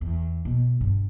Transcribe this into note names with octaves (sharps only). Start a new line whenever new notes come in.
E2
B2
G2